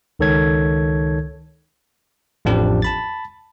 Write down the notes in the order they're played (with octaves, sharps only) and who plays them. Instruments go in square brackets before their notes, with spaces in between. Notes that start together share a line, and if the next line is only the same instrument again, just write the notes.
[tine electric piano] C#2 D#3 A4 C#5 G#6
A1 F2 F3 D4 G4
A5 B5 A6